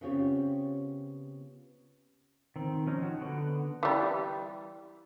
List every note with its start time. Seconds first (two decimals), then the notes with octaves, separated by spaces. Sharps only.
0.01 C#3 B3 C4 F4 G4 C#5
2.56 D#3 C4
2.87 F3 C#4 D#4
3.03 F#4
3.21 D3 B3
3.83 E3 G3